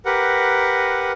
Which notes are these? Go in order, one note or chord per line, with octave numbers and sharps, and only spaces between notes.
G4 A#4 B4 F#5